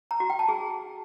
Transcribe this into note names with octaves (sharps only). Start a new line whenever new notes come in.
A#5
F#4
G5
A5
G#4